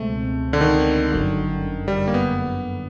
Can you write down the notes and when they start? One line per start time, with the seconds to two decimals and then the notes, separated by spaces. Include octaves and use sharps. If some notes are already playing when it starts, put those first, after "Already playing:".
Already playing: C#2 B2 G#3 A3 C4
0.53 D3
0.61 D#3
1.12 G1 F#2 D3
1.88 G3
2.08 A#3
2.14 B3